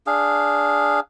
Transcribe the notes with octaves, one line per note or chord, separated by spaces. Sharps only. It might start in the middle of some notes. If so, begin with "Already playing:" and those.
D4 G#4 F5